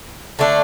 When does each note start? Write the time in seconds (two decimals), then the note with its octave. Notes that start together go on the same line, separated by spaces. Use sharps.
0.39 D3 A3 D4